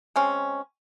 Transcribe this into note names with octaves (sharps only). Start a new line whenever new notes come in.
G#3 C4 C#4